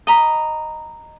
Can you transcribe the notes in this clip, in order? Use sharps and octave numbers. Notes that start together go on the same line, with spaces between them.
D#5 A#5 B5